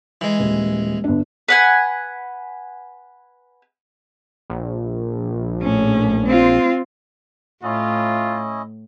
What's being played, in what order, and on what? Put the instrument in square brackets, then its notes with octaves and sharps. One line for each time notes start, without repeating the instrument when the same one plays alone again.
[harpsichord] E3 G#3
[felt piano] D#1
G1 D4
[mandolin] B4 F#5 G#5
[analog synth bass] A#1
[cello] A2 C#4
C4 F4
[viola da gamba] A2 [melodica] C#4 E4 D#5 [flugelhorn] F4